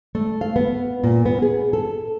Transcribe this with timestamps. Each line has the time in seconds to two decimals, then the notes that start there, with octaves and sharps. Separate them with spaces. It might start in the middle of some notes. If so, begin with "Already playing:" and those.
0.15 A3
0.41 F5
0.56 B3
1.04 A#2
1.26 B3
1.42 G#4
1.73 A4